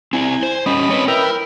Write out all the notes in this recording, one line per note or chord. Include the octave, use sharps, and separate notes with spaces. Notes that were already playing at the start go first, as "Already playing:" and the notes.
C4 E4 G#5
C5
G3 C#4 D#5 B5
C4 B4 C#5
E4 A#4 B4 G5